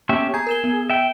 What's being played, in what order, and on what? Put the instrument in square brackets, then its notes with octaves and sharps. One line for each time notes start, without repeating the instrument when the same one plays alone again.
[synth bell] A#3 B3 [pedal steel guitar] C#4 G4 E5
[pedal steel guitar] G#4 [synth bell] A#5 G6 G#6
[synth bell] A#4 E7 G7
B3
[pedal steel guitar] E5 G5